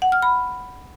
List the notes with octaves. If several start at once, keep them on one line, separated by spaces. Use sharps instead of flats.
F#5
F6
B5